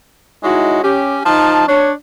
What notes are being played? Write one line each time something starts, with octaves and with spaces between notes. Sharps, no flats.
G#3 D#4 E4 F#4 C#5
C#4 G4
F3 D#4 A5
D4 C#5